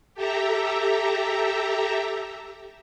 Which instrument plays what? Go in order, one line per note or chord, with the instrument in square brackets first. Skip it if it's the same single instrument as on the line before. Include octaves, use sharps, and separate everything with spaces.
[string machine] G4 A4 E5 A#5